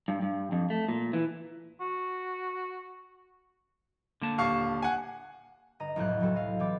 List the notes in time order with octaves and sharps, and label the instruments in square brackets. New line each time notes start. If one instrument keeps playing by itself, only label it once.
[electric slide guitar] G2
G2
F2
A3
A#2
E3
[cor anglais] F#4
[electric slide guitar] D3 A#3 A5
[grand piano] D#1 F5 C#6
F#5 G#5
[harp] G1 D#5 A#5
C2 F2 A2 F#3 C5 F#6
C3 F#3 E4 F#4 A4
D#5 F5
B2 E3 C4 D6 A6